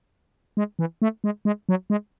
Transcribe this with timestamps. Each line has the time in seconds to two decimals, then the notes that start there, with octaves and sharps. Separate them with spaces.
0.57 G#3
0.79 E3
1.02 A3
1.24 G#3
1.45 G#3
1.69 F#3
1.90 G#3